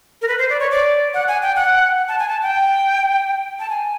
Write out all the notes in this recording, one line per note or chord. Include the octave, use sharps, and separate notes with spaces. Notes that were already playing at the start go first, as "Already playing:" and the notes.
A#4
B4
C5
D5
C#5
D5
F#5
G#5
G5
F#5
A5
G#5
A5
G5
A5
G#5